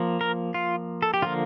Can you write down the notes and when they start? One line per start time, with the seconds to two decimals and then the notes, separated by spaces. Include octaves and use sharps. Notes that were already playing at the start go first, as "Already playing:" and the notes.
Already playing: F3 A#3
0.21 A#4
0.54 F4
1.03 A4
1.14 G4
1.22 D3 F3 A#3 F4